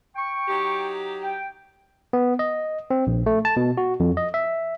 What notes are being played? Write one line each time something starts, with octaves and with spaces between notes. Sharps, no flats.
G5 C#6
F#3 D#4 G4
G5
B3
D#5
C4
A#1
A3
A5
B2
F#4
F2
D#5
E5